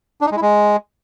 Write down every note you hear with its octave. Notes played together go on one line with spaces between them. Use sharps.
D4
D#4
G#3
E4
G#3